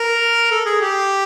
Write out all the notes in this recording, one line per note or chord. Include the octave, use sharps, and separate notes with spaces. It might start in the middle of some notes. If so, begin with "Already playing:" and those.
Already playing: A#4
A4
G#4
G4